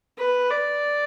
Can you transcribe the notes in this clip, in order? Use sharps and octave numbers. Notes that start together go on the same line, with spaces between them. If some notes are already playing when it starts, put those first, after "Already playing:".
B4
D5